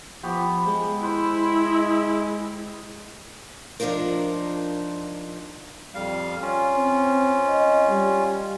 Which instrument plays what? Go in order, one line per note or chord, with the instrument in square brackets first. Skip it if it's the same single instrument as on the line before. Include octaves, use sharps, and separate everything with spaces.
[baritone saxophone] F3 [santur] B3 G4 C#6
[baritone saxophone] G#3
[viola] E4 [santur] B4 C5 E6
[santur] D#5
[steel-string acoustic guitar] F3 D4 D#4 F4 A#4
[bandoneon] F2 G3 F5
C#4 F4
[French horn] C4
D#5
G3